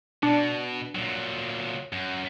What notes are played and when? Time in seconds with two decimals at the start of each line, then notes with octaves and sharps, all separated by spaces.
0.23 B2 D4
0.95 A#2 F#3
1.93 F#2